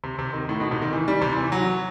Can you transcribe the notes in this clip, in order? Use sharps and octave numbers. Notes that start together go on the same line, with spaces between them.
C3
C3
D#3
A2
B2
C3
D#3
E3
G3
C3
E3
F#3